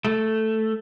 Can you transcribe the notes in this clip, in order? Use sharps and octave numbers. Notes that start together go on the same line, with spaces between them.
A3